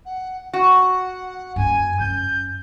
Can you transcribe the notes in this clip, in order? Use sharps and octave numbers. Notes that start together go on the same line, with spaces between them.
F#5
F#4 F#5
F#2 A#3 G#5
F#2 G6